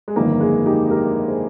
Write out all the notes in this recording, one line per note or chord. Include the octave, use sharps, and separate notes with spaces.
G#3
G1 F2 D#3 A#3
G#3
D#4 G4
G4 A#4
G#4 C5